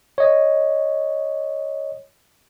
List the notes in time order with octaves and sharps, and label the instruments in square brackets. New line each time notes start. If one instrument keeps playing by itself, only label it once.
[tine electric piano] C#5 D#5